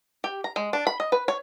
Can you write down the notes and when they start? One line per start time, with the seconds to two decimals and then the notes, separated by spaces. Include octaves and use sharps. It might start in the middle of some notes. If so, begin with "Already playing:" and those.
0.24 G4
0.44 A#5
0.56 G#3
0.73 D4
0.87 B5
1.00 D#5
1.12 B4
1.28 C#5